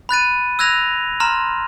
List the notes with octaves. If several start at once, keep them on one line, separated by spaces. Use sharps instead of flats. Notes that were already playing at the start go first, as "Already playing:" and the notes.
B5 F#6 A6 D#7
E6 F#6 G#6 A#6 F7
A#5 C6 F6